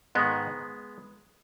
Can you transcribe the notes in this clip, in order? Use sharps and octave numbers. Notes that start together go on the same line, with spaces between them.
G#2 D#3 G#3 B3